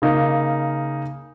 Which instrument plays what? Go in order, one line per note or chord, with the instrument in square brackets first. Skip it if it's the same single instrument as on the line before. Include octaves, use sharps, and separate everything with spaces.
[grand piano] C#3 A#3 D#4